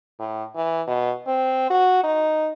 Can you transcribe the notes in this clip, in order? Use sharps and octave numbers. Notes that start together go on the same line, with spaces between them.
A2
E3
B2
C4
F#4
D#4